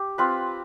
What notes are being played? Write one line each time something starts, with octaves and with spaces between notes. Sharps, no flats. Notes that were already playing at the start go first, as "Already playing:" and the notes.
Already playing: G4
C4 F4 B4